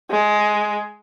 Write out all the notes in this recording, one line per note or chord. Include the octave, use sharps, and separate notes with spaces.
G#3